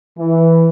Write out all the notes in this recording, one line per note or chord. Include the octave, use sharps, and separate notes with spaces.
E3